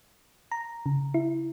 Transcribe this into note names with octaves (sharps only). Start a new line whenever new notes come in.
A#5
C#3
E4